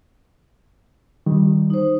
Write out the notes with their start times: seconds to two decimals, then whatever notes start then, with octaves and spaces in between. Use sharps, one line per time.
1.26 D#3 G3
1.70 D#4 C5